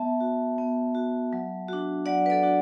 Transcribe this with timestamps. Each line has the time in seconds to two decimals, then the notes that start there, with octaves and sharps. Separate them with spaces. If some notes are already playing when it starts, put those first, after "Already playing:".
Already playing: B3 E5 A5
0.20 F#4
0.58 B3
0.95 F#4
1.33 F#3
1.68 D4 F#4
2.06 F#3 D5 F#5
2.26 B4
2.30 A4 D5
2.43 D4 F#4